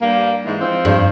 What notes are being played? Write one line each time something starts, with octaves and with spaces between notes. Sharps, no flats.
G2 G3 A#3
G#2 E3 G#3
F3 C4
G2